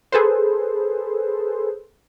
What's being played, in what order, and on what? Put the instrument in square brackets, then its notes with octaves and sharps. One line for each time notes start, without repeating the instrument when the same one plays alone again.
[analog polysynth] G#4 A4 B4 C5